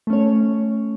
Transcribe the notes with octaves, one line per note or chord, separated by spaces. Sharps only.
A3 C#4 C#5